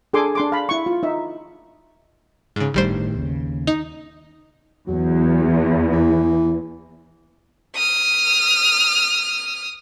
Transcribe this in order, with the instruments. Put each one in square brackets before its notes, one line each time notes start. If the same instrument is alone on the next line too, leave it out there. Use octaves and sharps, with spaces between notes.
[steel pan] D4 G#4 A4 G#5 C6 D6
D4 C6 D6
F5 B5
E4 C#6
F4
D#4 E5
[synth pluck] G#2 C#3
[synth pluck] G1 G3 C5 [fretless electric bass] A2 D#3
[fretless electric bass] D#2 C#3
[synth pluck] D#4
[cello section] E2 [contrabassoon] F#3
[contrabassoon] E3
[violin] D#6 F6